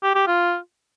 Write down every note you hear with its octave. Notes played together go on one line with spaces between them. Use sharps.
G4
G4
F4